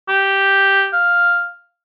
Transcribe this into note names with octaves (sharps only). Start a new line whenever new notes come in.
G4
F5